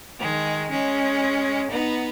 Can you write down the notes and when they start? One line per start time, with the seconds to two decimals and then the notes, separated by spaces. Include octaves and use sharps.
0.20 D#3 G#3
0.70 G#3 C#4
1.71 B3 D#4